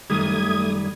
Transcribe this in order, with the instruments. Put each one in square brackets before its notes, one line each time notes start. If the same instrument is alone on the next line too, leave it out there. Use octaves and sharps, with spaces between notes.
[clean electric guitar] F#2 D#3 G3 [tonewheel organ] A3 D#6 G#6